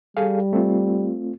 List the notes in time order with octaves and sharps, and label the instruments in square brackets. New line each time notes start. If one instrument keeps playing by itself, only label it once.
[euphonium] G3 [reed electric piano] G#4 A4 F5
[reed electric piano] A3 C4 F4